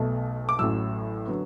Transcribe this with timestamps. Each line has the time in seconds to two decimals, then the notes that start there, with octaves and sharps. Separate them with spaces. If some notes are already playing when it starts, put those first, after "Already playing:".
Already playing: B1 B2 A3
0.49 D6
0.59 A1 A2 F#3 E6
1.27 D3 F#3 B3